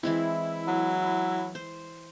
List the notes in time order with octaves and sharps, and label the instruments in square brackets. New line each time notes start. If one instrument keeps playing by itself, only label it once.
[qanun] E3 G#3 C4 [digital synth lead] E4
[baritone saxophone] F#3
[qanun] C5